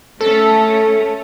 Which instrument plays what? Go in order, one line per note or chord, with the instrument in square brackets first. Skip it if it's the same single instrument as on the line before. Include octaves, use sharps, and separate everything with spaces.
[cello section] A3 C#4 [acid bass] A4